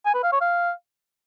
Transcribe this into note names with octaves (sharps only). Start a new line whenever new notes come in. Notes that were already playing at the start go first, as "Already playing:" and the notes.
G#5
B4
F5
C#5
F5